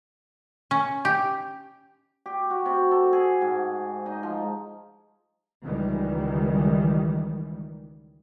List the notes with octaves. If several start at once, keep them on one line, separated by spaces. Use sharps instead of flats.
C#4
G4
G4
F#4
C3
A4
G#4
G#2
D#4
F3
C#2 D#3 E3 G3